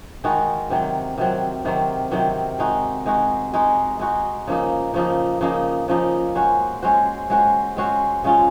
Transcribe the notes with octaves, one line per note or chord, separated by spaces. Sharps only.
D#3 G#3 D#4 F#4
C3 D#3 F#3 C4
C3 D#3 F#3 C4
C3 D#3 F#3 C4
C3 D#3 F#3 C4
G#3 D#4 F#4
G#3 D#4 F#4
G#3 D#4 F#4
G#3 D#4 F#4
C#3 F3 A#3 D#4
C#3 F3 A#3 D#4
C#3 F3 A#3 D#4
C#3 F3 A#3 D#4
G#3 C#4 F#4 C5
G#3 C#4 F#4 C5
G#3 C#4 F#4 C5
G#3 C#4 F#4 C5
C#3 G#3 C#4 F4